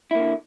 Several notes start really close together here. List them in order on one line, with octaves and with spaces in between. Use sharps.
E4 A#3 D3